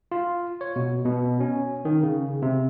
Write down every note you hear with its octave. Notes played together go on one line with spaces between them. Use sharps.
F4
C#5
B2
B2
C#4
D#3
C#3
C3